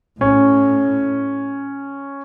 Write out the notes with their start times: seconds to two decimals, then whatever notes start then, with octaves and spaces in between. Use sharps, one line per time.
0.20 A2 C#4